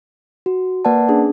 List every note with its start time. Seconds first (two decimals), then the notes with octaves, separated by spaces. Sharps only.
0.46 F#4
0.85 A#3 B4 D5 F#5 A5
1.08 C#4 D4 G#4